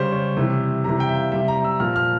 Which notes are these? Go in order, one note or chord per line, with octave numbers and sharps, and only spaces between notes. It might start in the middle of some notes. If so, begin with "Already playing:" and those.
Already playing: C#3 G3 C5
C#5
C3 E3 G3
C3 E3 G3 A#5
G5
E5
F5
C3 G3 E5
A#5
E6
A#2 F3 F6
F6